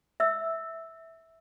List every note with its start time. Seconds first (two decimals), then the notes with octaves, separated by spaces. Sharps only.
0.20 E5 E6